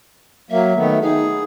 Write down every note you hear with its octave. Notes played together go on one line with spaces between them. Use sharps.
F#3 A#3 E5
D#3 A3 B3
D#4 G#4